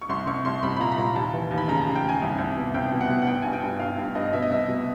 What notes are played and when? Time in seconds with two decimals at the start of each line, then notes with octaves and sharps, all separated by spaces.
0.01 C#6
0.09 C2 C6
0.27 C2 C#6
0.45 C2 C6
0.63 C2 B5
0.76 B5
0.80 A#2 A#5
0.92 B5
0.98 A#2 A#5
1.15 D#2 A5
1.33 E3
1.51 D#2
1.58 B5
1.68 C#3 A#5
1.82 A5
1.87 D#2
1.95 G5
2.03 D#2
2.09 G#5
2.22 C2
2.38 C2
2.57 B2
2.74 C2 G5
2.92 B2
3.01 F#5
3.09 B2
3.22 F#5
3.27 G2 G5
3.42 G2 G#5
3.53 G5
3.63 G2
3.79 G2 F5
3.98 G2
4.15 G2 D#5
4.33 B2 E5
4.42 D#5
4.50 C2 E5
4.68 B2